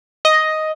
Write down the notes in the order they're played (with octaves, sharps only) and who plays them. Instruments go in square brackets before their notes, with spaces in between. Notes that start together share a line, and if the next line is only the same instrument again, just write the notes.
[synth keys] D#5